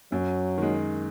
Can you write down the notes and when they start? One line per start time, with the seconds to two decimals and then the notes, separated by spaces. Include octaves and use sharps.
0.12 F#2 F#3
0.58 D#3 G#3